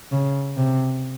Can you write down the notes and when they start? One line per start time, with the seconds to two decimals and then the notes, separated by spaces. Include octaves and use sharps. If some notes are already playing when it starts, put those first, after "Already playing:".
0.12 C#3
0.57 C3